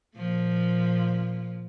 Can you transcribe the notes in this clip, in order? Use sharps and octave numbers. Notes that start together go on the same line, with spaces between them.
A#2 F3